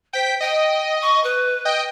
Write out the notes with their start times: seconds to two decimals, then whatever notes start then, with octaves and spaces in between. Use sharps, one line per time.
0.13 C5 G5 B6
0.40 D#5 G5
1.01 C#6
1.23 B4
1.65 D#5 G5